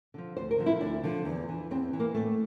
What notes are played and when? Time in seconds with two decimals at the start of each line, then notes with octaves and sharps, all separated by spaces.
0.14 D3 F3
0.37 D2 C5
0.51 A#4
0.58 D3 F3
0.66 E4
0.81 D2 D4
1.04 D3 F3
1.25 E2
1.49 E3
1.71 E2 C4
1.93 E3
2.00 A#3
2.15 A2 A3